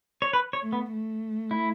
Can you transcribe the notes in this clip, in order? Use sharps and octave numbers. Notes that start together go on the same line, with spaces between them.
C#5
B4
C#5
A3
B3
A3
E4